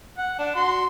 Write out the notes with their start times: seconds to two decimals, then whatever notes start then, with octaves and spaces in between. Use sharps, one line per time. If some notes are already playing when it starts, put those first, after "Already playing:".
0.18 F#5
0.39 D4
0.56 F#4 C6